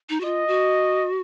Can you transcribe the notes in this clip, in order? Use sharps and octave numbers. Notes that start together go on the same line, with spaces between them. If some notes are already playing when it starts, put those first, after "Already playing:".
D#4
F#4
F4 D#5
F#4